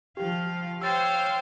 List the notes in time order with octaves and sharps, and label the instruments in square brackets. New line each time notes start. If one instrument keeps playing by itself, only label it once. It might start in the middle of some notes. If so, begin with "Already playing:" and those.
[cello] F3 F5 [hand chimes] G4
[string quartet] C5 C#5 F5 [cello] G5 [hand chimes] E6 A6